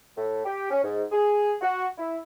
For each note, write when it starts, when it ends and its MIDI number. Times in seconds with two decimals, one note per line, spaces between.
0.16 0.40 45
0.44 0.70 67
0.70 0.80 61
0.83 1.02 44
1.12 1.53 68
1.61 1.85 66
1.97 2.19 64